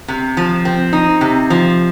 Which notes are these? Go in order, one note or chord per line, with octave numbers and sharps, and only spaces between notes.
C3
F3
C4
D#4
C3
F3